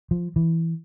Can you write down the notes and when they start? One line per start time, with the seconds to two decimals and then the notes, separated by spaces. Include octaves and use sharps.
0.11 F3
0.36 E3